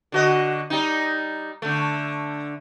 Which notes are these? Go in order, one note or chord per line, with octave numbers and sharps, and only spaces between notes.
D3 F#4 D#5
G3 D#4
D3 A3